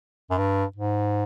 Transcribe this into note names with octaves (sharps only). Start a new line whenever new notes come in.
F#2
G2
G#2